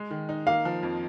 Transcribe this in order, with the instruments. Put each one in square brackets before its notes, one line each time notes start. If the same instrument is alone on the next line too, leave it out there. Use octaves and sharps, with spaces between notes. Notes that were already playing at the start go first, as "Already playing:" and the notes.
Already playing: [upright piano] G#3
D#3
D#4
[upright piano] A#3 [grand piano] F5
[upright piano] F3
F2